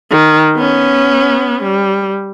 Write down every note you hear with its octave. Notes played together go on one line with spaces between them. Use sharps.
D#3
B3 C#4
G3